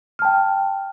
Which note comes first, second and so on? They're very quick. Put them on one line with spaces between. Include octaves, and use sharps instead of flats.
F6 A5 G5